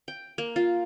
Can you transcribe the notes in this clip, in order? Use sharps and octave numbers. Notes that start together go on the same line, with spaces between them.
G5
A#3
F4